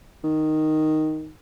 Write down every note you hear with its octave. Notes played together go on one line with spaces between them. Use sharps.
D#3